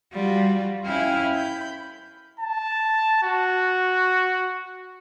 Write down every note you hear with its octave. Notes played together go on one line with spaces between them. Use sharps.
G3 F4 F#4
C#4 E4 F5 G5 G#5
B5 G6
A5
F#4